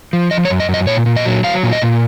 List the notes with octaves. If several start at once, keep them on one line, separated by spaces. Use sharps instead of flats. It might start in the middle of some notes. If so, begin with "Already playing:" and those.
F3
F3 D#5
C#5
F#2
D#5
F#2
D#5
A#2 C#5
A#2
D#5
F#3
F#3 F5
A#2
D#5
A#2